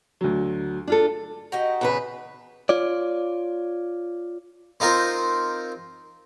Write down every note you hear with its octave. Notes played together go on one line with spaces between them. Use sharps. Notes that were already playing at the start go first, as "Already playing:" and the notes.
D2 F#3
D4 F4 A4
D#4 F#4 G4 D#5
E2 C#3 B4
F4 C#5 D5
C4 D#4 F4 A#4 C5